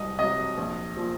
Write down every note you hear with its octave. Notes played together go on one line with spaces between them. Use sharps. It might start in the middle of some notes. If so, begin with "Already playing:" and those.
Already playing: C2 C3 F#3 D#5
C3 F#3 D#5
A#1
A#2 F3